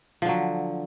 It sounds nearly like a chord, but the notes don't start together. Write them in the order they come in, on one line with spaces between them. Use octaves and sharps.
F3 D3 F#3